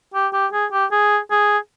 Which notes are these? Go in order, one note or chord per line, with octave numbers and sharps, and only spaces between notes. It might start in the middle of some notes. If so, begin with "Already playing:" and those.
G4
G4
G#4
G4
G#4
G#4